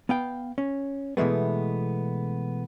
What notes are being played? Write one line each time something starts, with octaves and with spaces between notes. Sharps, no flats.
B3 F5 G5
C#4
B2 E3 G#3 A3 B3